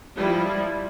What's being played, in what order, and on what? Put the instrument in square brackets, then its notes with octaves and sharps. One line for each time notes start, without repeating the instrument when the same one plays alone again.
[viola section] F3 G3 E4